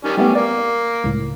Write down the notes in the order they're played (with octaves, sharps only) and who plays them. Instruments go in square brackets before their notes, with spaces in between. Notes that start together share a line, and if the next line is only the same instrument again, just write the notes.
[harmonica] D#3 G3 C#4
[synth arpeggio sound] G3 A3 B3 [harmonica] C#4 G4
[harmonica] A#3 [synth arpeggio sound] D5
[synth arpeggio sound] C#2 A2